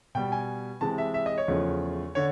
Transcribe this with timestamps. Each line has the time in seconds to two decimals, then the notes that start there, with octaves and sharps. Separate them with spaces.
0.15 B2 G3 G5
0.32 G#5
0.81 C3 E3 G#3 A5
0.98 E5
1.14 E5
1.26 D#5
1.38 C#5
1.48 E2 C#3 F3 A3
2.15 D3 C#5